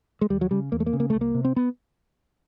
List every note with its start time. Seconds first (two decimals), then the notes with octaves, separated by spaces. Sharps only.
0.21 G#3
0.30 D#2 G3
0.41 F#3
0.51 C#3 G3
0.72 E2 A#3
0.80 A3
0.86 A#3
0.93 C#3
1.00 A#3
1.10 C2 A3
1.21 A#3
1.35 C3
1.45 C4
1.56 B3